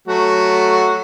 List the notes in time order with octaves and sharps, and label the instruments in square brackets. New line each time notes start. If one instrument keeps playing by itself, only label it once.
[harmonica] F#3 A3 F#4